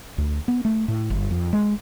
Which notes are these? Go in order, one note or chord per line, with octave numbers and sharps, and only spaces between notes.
D2
B3
A3
A2
G1
F2
G#3